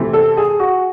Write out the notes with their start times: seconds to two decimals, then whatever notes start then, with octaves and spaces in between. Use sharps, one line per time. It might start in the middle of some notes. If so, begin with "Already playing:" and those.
Already playing: C3 E3 A3 C4
0.13 A4
0.37 G#4
0.59 F#4